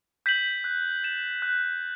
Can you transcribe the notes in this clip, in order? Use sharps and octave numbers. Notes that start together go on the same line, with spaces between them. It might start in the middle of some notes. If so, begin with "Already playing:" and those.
G6 B6 F#7
F#6
A6 E7
F#6